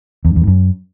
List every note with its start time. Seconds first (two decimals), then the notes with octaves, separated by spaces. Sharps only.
0.25 E2
0.30 G2
0.36 E2
0.42 G#2
0.47 F#2